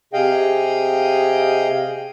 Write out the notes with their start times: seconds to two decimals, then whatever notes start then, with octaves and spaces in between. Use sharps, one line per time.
0.13 C3 G#4 D#5 F5 G5